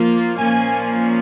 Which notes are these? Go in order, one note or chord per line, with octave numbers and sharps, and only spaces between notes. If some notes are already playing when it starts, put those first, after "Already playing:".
Already playing: F3 A#3 F4
A#2 F3 A#3 C#4 G#5